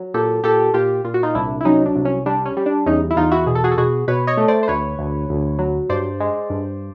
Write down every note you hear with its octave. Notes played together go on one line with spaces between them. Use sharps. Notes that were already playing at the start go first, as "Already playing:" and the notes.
Already playing: F#3
A#2 G4 A4
A#2 G4 A4
A#2 F4 G4
A#2 F4
F#4
D#4 F4
C2 D4 E4
E4
F#3 C#4 D#4
D4
C2
C#4
G3 D4
C#4
G3
D4
E2 C#4 D#4
E4
E2 D#4 F4
E4 F#4
B2 G#4
A4
F#4 G#4
A4
B2 F#4 G#4
B2 B4 C#5
C#5 D#5
A3
C5 D5
C5
D2 B4 C#5
D2
D2
F#3
G2 C5 D5
G#3
G2